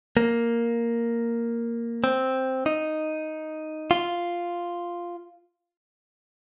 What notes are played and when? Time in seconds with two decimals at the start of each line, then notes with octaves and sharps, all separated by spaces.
0.17 A#3
2.04 C4
2.66 D#4
3.91 F4